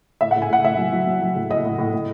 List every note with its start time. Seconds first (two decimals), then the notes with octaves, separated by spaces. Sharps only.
0.21 A2 E5
0.31 F#5
0.36 A2
0.42 G#5
0.50 A2 F#5
0.64 A2 E5
0.78 F#3
0.92 F#3
1.07 F#3
1.21 F#3
1.36 A2
1.50 A2 D#5
1.65 A2
1.78 A2
1.93 A2